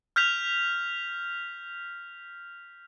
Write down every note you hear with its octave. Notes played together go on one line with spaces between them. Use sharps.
F6 G6 B6 F7